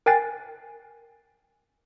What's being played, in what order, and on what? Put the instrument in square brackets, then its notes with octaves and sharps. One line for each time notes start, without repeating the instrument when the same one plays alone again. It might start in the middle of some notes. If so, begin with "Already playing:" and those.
[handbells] A#4 G5 G#5 F#6 A6 C7